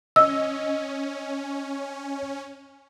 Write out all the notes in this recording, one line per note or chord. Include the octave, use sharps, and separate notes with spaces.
C#4 D#5 E6